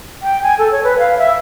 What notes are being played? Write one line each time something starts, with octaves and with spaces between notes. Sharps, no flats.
G5
G#5
A4
C#5
B4
F5
E5